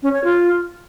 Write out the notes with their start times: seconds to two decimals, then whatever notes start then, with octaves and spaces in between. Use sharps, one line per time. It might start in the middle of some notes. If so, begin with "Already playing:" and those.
0.03 C#4
0.13 C#5
0.24 F4